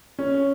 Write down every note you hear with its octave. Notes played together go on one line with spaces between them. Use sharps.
C#4